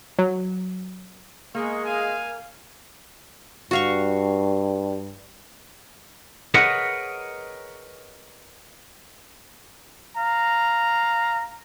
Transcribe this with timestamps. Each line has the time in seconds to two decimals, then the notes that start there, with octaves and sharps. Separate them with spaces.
0.19 F#3
1.55 G#3 A#3 C#6
1.85 F5 G#5
3.71 G2 F#4 F5 C#6
6.54 G#4 A#4 B4 C#5 D#5 F#5
10.16 F5 A#5